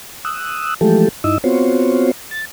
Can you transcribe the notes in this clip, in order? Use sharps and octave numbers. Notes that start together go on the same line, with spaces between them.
D#6 E6 F#6
E3 F3 G#3 A3 G4 A4
G2 D#4 E4 D#5 E6
B3 C4 F4 F#4 C5 C#5
A6